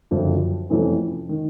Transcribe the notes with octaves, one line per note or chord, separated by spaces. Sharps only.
F#1 F2 D3 F3
F2 C3 E3 A3 C#4
D#3